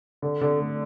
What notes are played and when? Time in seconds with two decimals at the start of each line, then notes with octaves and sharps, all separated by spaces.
0.22 D3
0.41 D3
0.60 A3